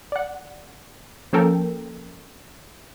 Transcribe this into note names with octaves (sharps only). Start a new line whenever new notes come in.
D5 F#5
F3 A#3 C#4 A4 A#4 G5